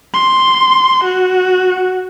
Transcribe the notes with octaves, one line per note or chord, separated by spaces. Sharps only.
C6
F#4